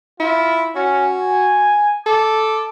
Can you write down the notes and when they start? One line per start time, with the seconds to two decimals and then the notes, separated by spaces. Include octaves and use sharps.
0.20 E4 F4
0.76 C#4 F#4
1.21 G#5
2.06 A4 D6